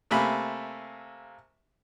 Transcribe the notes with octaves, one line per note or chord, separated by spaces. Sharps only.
C3 A3 A#3 G#5 B5